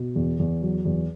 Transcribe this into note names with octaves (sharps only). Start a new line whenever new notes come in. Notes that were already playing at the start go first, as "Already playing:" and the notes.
Already playing: B2
E2
E2
F#3
E2